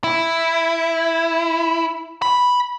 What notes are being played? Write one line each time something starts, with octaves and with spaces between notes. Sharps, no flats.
E4
B5